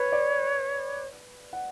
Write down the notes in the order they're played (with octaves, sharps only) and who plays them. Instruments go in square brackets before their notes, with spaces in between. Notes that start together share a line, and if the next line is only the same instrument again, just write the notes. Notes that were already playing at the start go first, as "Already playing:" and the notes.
Already playing: [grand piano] B4 [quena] C#5
[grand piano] D5
F#5